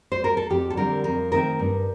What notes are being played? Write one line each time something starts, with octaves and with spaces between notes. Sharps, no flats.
C5
A#4
A4
F2 G4
A4
D3 G3 C4 A#4
F2 A#4
D#3 A3 C4 A#4
G2